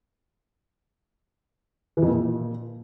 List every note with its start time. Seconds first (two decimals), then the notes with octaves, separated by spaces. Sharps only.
1.97 E3
2.02 F2
2.08 A#2